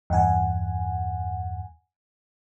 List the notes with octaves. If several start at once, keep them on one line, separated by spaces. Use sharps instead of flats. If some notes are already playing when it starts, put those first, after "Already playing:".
E2 G2 F#5 G#5